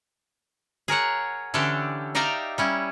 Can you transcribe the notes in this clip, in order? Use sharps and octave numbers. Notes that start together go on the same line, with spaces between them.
G#4 A#4 C#5 F#5
D3 E3 C#4 D4 G4
D#4 G4 D5 E5 F5 A#5
G3 C#4 E4